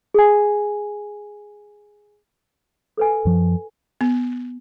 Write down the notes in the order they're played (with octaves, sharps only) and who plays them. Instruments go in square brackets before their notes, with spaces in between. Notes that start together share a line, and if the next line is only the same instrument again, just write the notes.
[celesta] G#4 G#5
[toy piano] A4 B4 G#5
[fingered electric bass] F#2 F3
[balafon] B3